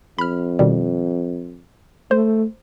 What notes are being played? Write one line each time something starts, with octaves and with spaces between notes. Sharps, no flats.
F2 B5 F6
B2 D#3 G3
A3 C5